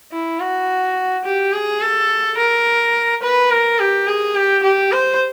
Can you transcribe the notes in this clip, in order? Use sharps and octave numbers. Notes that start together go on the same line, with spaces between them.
E4
F#4
G4
G#4
A4
A#4
B4
A#4
G4
G#4
G4
G4
C5